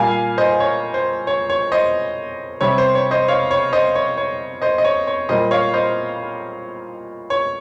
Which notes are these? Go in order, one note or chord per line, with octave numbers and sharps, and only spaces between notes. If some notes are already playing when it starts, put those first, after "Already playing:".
Already playing: A#2 G3 A#3 F5 G#5
C5 D#5
C#5
C5
C#5
C#5
C5 D#5
C3 G3 C4 C#5
C5
C#5
C5 D#5
C#5 F5
C#5
C5 D#5
C#5
C#5
C5 D#5
D#5
C#5
C#5
A#2 G3 A#3 C5 D#5
C#5 F5
C5 D#5
C#5